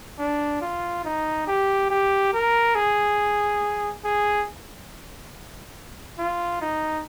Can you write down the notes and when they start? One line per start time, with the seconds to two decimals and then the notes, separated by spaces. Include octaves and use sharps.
0.19 D4
0.62 F4
1.05 D#4
1.47 G4
1.90 G4
2.33 A#4
2.75 G#4
4.04 G#4
6.19 F4
6.61 D#4